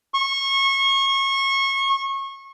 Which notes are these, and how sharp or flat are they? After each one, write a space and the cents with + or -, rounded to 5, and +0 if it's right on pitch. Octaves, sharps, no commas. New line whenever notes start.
C#6 -25